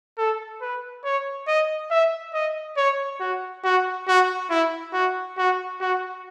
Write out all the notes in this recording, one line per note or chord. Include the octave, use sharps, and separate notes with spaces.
A4
B4
C#5
D#5
E5
D#5
C#5
F#4
F#4
F#4
E4
F#4
F#4
F#4